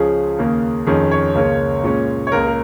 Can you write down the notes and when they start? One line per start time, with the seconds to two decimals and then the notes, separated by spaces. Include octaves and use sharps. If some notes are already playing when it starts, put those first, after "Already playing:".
Already playing: C#2 C#3 F3 C#4 G#4
0.38 D#2 C#3 A#3
0.86 F2 D#3 C#4 G#4
1.11 C#5
1.35 C#2 C#3 A#3 C#4
1.83 A#2 G#3 C#4
2.27 C#5
2.32 C#2 C#3 A#3 A#4
2.47 A#4